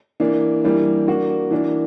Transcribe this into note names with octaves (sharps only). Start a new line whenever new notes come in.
E3 A#3 D4
E3 G3 A#3 D4
A#3 D4 F#4
E3 A#3 D4